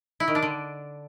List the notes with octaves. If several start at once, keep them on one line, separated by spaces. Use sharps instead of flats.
E4
D#3
D4
D3